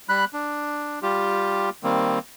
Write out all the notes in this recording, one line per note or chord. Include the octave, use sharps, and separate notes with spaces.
G3 B5 F#6
D4
G3 F4 G4
D#3 G3 A#3 C4